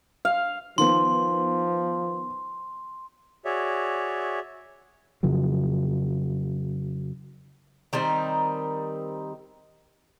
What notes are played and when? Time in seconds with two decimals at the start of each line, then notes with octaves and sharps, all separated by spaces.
0.25 F5
0.78 D#3 F3 B3 C6
3.45 F#4 G#4 C#5 D5 E5
5.23 F2 C#3 F3 F#3
7.93 D#3 G3 C4 D#4